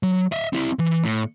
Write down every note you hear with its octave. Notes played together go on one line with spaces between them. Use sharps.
F#3
D#5 E5
C4 E4
E3
A2